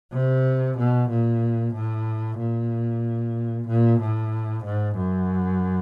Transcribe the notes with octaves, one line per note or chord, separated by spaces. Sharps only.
C3
B2
A#2
A2
A#2
A#2
A2
G#2
F#2